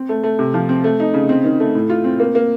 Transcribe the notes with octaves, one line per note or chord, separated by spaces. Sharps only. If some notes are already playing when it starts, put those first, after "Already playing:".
Already playing: C4
A3
A3
C3
F3
C4
A3
D#4
C#3
C4
D#3
A3
A2
F4
C4
A#3
A#3